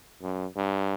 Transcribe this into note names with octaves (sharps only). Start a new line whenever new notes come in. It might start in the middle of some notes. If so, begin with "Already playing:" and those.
F#2
G2